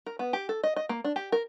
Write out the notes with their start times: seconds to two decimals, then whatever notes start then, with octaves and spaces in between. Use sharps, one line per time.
0.06 A#4
0.19 B3
0.33 G4
0.49 A4
0.63 D#5
0.76 D#5
0.89 A#3
1.04 D4
1.16 G4
1.32 A#4